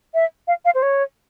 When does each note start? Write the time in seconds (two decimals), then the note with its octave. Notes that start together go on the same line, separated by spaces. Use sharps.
0.14 E5
0.48 F5
0.65 F5
0.75 C5
0.82 C#5